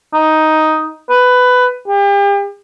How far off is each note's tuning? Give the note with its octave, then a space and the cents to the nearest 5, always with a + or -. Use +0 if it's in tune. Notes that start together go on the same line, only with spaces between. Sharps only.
D#4 +5
B4 +15
G4 +40